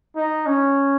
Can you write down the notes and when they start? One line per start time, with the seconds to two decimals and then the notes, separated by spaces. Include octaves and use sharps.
0.15 D#4
0.46 C#4